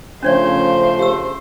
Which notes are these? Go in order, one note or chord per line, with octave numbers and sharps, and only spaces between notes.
C#3 F3 A3 C#4 D4 C5 C#5
G4 E6